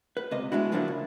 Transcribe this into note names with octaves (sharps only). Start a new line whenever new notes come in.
B4
C#2 C3 D#5
G#3 B3 D4 E4 F#4
D3 F3 F#3 A#3 D4 E4
C#2